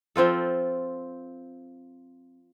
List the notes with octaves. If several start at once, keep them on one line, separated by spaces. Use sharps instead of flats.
F3 C4 F4 A4